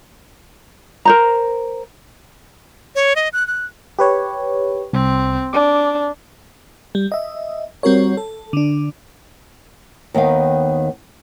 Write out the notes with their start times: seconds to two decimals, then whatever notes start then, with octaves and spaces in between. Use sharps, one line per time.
1.05 A#4 C5 A#5
2.95 C#5
3.16 D#5
3.33 F#6
3.48 F#6
3.99 G4 B4 C#5
4.93 C2 C4
5.53 D4 D6
6.95 G3
7.12 D#5 E5
7.83 G3 C4 F#4 A#4 C#5
8.17 A4
8.53 D3 D4
10.14 D#2 D#3 B3 F5